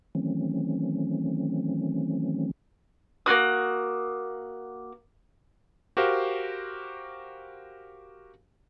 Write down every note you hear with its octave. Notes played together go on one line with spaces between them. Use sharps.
D#3 E3 F#3 A3 C4 C#4
A#3 C4 F#4 D#6
F#4 G4 A#4 C5 F5